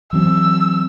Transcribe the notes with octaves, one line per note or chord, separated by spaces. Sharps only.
E3 F#3 C4 E6